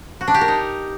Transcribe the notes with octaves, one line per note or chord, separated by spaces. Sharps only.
F#4
D4
G4
A#4
D#4